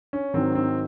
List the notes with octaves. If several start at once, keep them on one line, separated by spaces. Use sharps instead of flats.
C#4
G#2 D#3 F#3 C4
C4